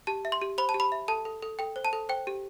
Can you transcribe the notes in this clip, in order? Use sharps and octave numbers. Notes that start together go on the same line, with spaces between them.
G4 A5
E5
C6
G4
C5 B5
A5
G4
B5
E5
A4 A5
A4
A4
A4 G5
C5
A5
A4
C5 G5
G4